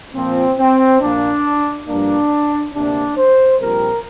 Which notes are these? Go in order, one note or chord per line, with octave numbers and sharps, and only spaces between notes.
A#2 F3 A#3 C4
C4
A#1 A#2 A#3 D4
G2 F3 A#3 D4
D2 C3 A#3 D4
C5
A#1 A#2 G3 C4 A#4